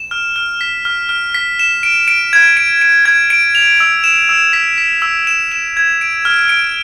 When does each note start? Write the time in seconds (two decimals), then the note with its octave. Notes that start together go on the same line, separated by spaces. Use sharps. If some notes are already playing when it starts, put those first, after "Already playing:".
Already playing: E7
0.11 F6
0.36 F6
0.61 B6
0.85 F6
1.09 F6
1.34 B6
1.59 E7
1.83 D7
2.08 D7
2.33 G#6
2.57 D7
2.81 D7
3.06 G#6
3.30 D7
3.55 F7
3.80 E6
4.04 E7
4.29 E6
4.53 B6
4.78 B6
5.02 E6
5.27 E7
5.52 E7
5.77 G#6
6.01 D7
6.25 F6
6.49 D7